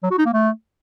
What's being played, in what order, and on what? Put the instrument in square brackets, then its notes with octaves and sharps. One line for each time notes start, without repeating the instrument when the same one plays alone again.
[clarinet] F#3
F#4
D#4
A#3
A3